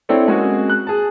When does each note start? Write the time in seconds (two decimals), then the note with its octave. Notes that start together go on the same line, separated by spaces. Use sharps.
0.09 C4 D4 E4 A4 C#5
0.28 G#3 A#3 C4 C#4 F#4 G#4
0.70 F#6
0.87 G#4 A5